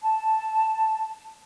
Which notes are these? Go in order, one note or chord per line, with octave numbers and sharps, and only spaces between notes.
A5